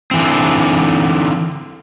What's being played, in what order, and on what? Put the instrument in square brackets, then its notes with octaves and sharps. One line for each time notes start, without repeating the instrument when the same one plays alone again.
[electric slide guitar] D3 E3 C4